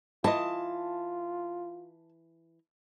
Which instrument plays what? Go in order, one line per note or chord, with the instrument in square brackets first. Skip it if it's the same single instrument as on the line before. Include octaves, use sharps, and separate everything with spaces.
[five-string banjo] E3 D#5 [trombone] F4 [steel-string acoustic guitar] A5